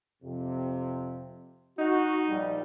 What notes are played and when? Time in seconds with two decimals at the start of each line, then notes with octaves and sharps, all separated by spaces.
0.23 F2 C3
1.79 D#4 F#4
2.29 A#1 G3